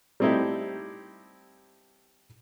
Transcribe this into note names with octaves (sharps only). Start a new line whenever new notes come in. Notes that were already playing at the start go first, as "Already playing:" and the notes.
G3 A3 C4 D#4 E4 G4